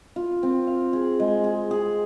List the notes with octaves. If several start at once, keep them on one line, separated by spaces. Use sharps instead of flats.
F4
C4
F5
G#4
G#3
G#4
G#4